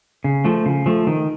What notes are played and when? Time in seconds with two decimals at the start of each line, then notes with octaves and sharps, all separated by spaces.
0.24 C#3
0.45 F3 A3
0.66 C#3
0.86 F3 A3
1.07 D#3